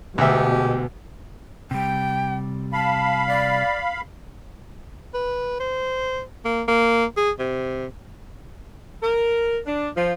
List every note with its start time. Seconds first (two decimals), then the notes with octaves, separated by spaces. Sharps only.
0.18 D2 B2 G#3 G4 E5
1.71 C3 G3 G5
2.73 F5 A5 B5
3.27 D5
5.14 B4
5.60 C5
6.45 A#3
6.68 A#3
7.17 G#4
7.39 C3
9.02 A#4
9.66 D4
9.96 F3